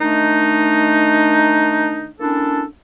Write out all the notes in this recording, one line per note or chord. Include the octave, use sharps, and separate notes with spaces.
D#3 A3 D4 D#4
A#3 C#4 D4 E4 A4